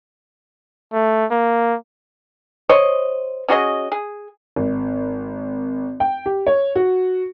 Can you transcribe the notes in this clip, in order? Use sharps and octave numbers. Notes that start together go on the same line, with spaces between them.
A3
A#3
C5 C#5 D#5
C#4 F#4 G#4 D#5
G#4
G#1
G5
G4
C#5
F#4